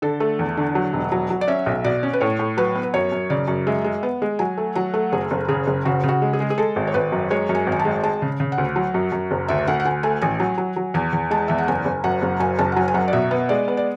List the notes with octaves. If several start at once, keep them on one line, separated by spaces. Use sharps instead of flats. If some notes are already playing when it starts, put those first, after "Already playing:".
D3 A4
A3
E2
D3
F#3
E1
F#3
F#3
D5
C#4 E5
B1
B2 D5
C#4
B4
A2 C#5
A2
F#3 B4
B3
B4
F#2 C#5
F#2
C#3 D5
F#2
G#3 E5
G#3
B3
G#3
F#3 G#5
A3
F#3 F#5
A3
F#1 G#4
F#1
C#3 G#4
F#1
C#3 F#4
C#3
F#4
G#3
G#4
G#3
G#4
G#3 A4
G#1
C#5
G#1 B4
F#2
G#3 C#5
F#2
G#5
G#1
G#5
A5
G#3
G#3 A5
C#3
C#3
F#5
D2
F#3
F#2
F#2
F#1
D2 E5
D2 F#5
F#5
D2 G#5
A3 G#5
A1 G#5
F#3
F#3
F#3
E2 G#5
E2
G#3 A5
E2 E5
F#5
F#1 G#5
F#1
F#2 F#5
F#1
F#2 G#5
F#1 A5
F#5
F#3 G#5
G#5
F#2 F#5
D5
B2 E5
B3
G#3 D5
B3
D5